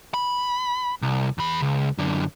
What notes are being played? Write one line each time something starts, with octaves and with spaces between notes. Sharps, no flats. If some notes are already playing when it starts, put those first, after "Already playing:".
B5
C2
E2 B5
C#2
F#2 D3